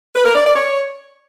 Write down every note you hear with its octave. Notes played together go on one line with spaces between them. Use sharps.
B4
A#4
D5
D5
C#5